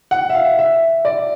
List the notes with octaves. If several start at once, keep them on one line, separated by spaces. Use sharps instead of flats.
F#5
E5
F5
E5
D5